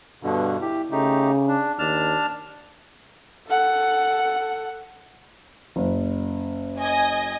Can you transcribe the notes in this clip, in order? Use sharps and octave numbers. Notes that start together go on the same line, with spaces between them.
G2 B2 D3
E4 G4
C#3 A3 D#4 G4
D4
D#2 D4 A5 F6
A4 F#5
F#1
D#5 G#5